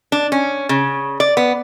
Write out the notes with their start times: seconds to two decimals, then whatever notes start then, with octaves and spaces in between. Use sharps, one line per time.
0.12 D4
0.32 C#4
0.69 C#3
1.20 D5
1.37 B3